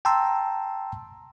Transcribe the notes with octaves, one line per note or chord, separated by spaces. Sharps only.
G5 A5 A#5 C6 E6